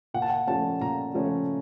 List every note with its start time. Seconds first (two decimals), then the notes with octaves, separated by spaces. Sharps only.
0.14 A#2 F#5
0.22 A5
0.29 F#5
0.47 F3 A3 C#4 A5
0.81 A#2 A#5
1.14 F3 A3 C#4